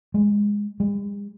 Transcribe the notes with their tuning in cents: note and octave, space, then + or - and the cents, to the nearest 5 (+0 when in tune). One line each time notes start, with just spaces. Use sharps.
G#3 -10
G#3 -45